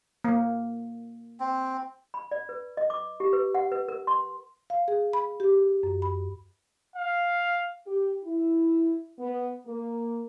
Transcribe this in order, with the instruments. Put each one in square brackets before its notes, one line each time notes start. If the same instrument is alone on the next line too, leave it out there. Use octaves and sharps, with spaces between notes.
[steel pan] A#3
[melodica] C4
[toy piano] B5
D5
B4
D#5
D6
G4
B4
F#5
B4
A#4
C6
[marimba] F5
G#4
B5
G4
F#2
B5
[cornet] F5
[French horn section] G4
E4
B3
A#3